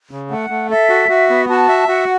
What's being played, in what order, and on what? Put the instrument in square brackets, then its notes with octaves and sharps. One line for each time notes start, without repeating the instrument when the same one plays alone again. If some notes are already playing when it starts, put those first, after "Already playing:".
[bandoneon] C#3
[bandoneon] A3 [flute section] F#5
[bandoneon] A3
[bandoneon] A4 [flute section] E5
[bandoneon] F#4
F#4
B3
[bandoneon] F#4 [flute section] A5
[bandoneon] E5
[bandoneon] F#4 [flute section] F#5